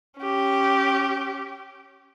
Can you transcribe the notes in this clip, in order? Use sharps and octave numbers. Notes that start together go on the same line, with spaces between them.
C#4 G4